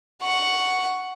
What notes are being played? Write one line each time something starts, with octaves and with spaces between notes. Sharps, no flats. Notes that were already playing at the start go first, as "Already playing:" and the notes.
F#5 C#6